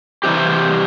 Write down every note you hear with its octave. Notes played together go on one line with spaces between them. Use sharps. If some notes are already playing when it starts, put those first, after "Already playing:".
C3 E3 G3 C4 G4